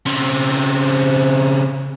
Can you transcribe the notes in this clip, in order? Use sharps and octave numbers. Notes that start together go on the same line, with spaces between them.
C#3 C4